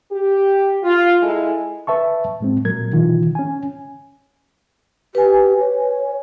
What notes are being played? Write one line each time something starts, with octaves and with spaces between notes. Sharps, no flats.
G4
F4
G#3 E4 A4
B4 E5 A5 C#6
A2 G#3 C4
A#2 F#3 A#4 G#6
B2 D#3 E3 F4
C#4 G#5
G4 B4 G#5
C#5